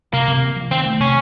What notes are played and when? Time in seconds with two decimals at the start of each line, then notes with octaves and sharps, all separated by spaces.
0.13 C3 A#3
0.28 C3
0.43 A#3
0.56 F3
0.71 D#3 C4
0.86 A3
1.00 C3 C#4